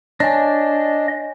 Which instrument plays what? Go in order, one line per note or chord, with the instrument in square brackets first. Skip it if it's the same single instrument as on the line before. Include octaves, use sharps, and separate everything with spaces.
[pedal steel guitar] D4 [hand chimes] C#5 G#5 [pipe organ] D#5